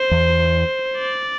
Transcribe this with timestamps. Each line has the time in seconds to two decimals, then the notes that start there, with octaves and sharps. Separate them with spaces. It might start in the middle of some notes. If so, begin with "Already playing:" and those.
Already playing: C5
0.11 E2
0.98 D5